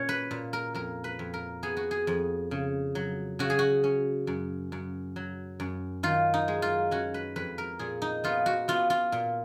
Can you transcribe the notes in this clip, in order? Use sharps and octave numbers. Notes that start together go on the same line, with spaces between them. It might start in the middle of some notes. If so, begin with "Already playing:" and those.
Already playing: A#2 C#4 C#5
B4
A#2
A#4
F2 A#4
B4
F2
A#4
B3 G#4
F#4
G#4
F2
C#3
F#3
C#3 F#4
G#4
F#4
C#4
F#2
F#2
F#3
F#2
D#3 F4
D#4
G#3
F4
C#4 F#4
B4
F2 B4
A#4
A#2 G#4
D#4
B3 F4
F#4
B3 F4
F4
A#2